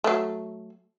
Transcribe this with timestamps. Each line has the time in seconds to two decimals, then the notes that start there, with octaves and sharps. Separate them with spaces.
0.04 F#3 A3